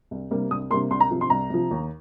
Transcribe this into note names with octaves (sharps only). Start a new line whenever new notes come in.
C2
C3 G3 A#3
C2 D#6
C3 G3 A#3 C6
C2 C6
A#5
C3 F3
C6
C2 A#5
C3 F3
D#2